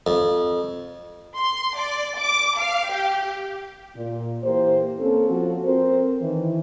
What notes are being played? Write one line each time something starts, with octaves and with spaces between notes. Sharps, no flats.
F2
C6
D5
D6
F5
G4
A#2
E3 A#3 G4 A#4 C5
A#3 C4 C#4 A4
F3 F#4 A4
C4 A#4 C5
D#3 E3